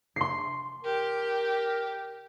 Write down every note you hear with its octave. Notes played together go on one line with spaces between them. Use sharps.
C6 C7
G4 A#4